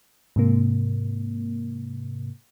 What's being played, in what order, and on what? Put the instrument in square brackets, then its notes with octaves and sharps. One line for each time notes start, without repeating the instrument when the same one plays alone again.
[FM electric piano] G#2 C3 A#3